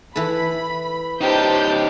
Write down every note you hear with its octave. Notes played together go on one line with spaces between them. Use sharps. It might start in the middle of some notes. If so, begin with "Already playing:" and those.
E3 A4 B5
C#4 D#4 G4 C5 A5 G6